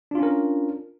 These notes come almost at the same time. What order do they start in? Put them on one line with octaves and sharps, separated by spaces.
D4 F4 C#4 A#4